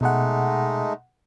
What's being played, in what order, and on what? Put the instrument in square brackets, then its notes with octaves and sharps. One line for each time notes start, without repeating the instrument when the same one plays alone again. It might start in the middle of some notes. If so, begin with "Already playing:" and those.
[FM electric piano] B2 F#5 [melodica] G#3 A3 D#4